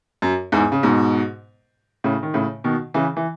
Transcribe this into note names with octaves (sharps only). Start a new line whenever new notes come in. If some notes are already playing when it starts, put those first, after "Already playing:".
F#2
E2 G#2
C#3
G#2 B2
A2 C#3
D#3
A2 C#3
B2 D#3
C#3 E3
E3